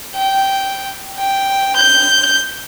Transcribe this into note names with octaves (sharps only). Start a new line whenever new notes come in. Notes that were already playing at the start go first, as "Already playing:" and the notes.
G5
G5
G6